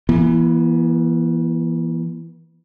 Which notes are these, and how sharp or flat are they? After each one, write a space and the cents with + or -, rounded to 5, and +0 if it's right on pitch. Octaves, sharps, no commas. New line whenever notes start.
E3 +15 B3 -45